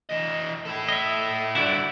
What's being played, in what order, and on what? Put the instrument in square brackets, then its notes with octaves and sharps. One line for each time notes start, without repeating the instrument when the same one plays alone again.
[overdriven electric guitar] E3 D#5
E4 A4
[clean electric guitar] D#5 E5
[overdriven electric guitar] G2 D3 [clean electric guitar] E4 F#4 D5